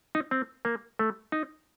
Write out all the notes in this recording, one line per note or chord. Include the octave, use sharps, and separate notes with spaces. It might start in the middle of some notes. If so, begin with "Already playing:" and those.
D#4
C4
A#3
A3
D#4